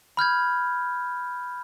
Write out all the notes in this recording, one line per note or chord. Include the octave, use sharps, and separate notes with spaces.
B5 F6 G6 G#6